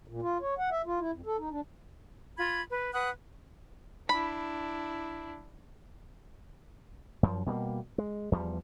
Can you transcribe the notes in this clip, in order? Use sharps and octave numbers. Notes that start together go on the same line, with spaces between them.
A#2
F4
C#5
F#5
E5
F4
E4
F2
A4
D#4
D4
F4 B5 G#6
B4
B4 F#5 D#6 F#6
D4 E4 B5
F#2 F3
B2 G3 A3 A#3
G#3
E2 F3 G3